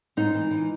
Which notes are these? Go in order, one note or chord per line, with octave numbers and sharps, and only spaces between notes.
G#2 D#4
E3
E3